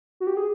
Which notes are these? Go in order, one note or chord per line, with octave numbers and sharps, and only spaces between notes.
F#4
G4
G#4